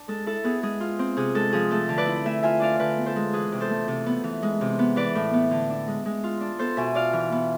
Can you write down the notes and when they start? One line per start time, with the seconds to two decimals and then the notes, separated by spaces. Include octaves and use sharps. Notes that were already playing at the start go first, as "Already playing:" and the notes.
Already playing: D4
0.08 G#3 A4
0.26 E4 A4
0.44 B3 G#4
0.63 G#3 G#4
0.80 F4
0.99 C4
1.17 C3 G#4
1.35 G#3 A4
1.53 F3 G#4
1.71 A3 A4
1.89 D3
1.98 B4 D5
2.07 E4
2.25 A3 E5 G#5
2.43 F4 E5 G#5
2.60 D4 D5 F5
2.79 D3 B4 D5
2.97 B3
3.06 A4 C5
3.16 G#3
3.33 E3 G#4 B4
3.52 C3
3.61 A4 C5
3.70 A3
3.88 C3
4.06 B3
4.24 E3
4.43 G#3
4.61 C3
4.79 B3
4.96 E3 B4 D5
5.15 A2
5.33 B3
5.51 D3
5.70 D4
5.88 G#3
6.06 G#3
6.24 F4
6.41 D4
6.59 B3 A4 C5
6.77 B2 E5 G#5
6.95 F4 D5 F5
7.13 E3
7.32 B3